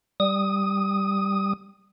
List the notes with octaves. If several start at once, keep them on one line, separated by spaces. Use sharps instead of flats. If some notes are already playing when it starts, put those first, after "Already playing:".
G3 D#6